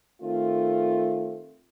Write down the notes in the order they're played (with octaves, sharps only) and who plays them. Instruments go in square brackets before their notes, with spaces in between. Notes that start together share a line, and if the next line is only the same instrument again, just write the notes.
[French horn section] D#3 A3 C4 F4